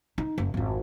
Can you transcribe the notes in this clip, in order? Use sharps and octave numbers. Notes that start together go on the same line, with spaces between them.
D#4
F#1
G#1 F2